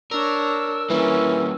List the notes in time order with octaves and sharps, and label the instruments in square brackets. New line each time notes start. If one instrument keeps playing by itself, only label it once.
[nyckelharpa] D4 C#5 [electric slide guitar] A#4 [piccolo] E6
[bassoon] E3 [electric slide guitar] G3 A#3 [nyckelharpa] C#4 A#4